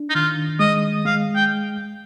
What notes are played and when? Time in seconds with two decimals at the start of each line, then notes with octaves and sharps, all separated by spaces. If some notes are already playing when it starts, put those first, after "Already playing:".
Already playing: D4
0.10 D#4
0.15 D#3 F4
0.60 G#3 D#5
1.06 G#3 F5
1.36 G5